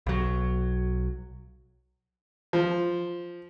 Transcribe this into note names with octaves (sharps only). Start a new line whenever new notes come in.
B1 F#3
F3